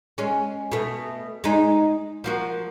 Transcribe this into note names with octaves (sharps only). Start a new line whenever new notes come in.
G#3 C#4
B2 A3
G#3 D#4
F3 A#3 F#4